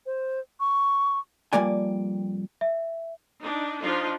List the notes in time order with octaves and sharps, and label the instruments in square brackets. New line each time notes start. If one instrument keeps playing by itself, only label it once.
[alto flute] C5
C#6
[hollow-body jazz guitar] F2 G3 A#3 D5 G#5
[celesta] E5
[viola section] D4 D#4
F3 D4 D#4 F4